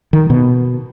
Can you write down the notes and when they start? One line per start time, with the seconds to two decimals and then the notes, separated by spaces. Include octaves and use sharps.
0.13 D#3
0.30 B2